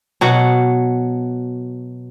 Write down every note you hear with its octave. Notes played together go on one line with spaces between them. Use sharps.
B2 F#3 F#5